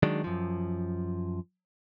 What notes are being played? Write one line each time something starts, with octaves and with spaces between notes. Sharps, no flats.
D#3 F#3 G#3 D4
F#2 F3